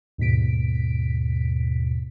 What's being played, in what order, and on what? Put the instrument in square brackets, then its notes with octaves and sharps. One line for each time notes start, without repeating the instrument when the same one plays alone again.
[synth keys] D#2 G#2 B2 B6 D7